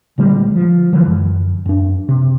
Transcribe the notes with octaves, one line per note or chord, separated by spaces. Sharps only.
A#1 D3 G3 G#3
F3
D3 E3 F3 G#3
F#2
F#2 D4
C3